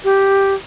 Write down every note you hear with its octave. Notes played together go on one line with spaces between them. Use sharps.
G4